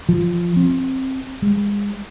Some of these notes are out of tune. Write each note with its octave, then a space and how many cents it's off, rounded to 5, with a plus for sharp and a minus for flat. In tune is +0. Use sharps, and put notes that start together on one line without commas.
F3 -10
C4 +15
G#3 -30